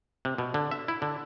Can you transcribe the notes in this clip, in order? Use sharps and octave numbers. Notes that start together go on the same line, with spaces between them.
C3
B2
D3
E5
E4
D3